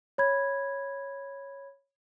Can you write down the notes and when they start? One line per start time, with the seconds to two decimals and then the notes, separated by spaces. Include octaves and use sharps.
0.18 C#5 B5 G#6